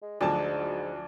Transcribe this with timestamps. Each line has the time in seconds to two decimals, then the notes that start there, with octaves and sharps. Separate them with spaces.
0.02 G#3
0.21 D2 G#2 F3 F#3 D4 A5